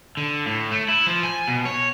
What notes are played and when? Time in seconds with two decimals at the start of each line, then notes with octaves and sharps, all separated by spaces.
0.17 D3
0.46 A2
0.71 A3
0.89 E4
1.07 F3
1.23 G#5
1.48 B2
1.65 C#5